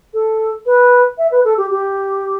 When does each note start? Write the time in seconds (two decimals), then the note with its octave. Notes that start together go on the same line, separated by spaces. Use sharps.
0.14 A4
0.66 B4
1.18 E5
1.32 B4
1.45 A4
1.58 G4
1.71 G4